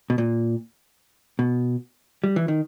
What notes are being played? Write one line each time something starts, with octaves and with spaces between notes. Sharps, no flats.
B2
A#2
B2
G3
E3
D#3